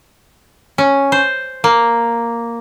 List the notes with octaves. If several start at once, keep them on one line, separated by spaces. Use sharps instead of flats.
C#4
C5
A#3